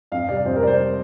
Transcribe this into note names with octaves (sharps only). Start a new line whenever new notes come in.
F2 F5
C3 G3 D5
F2 C5
A#4
C3 G3 C5 D5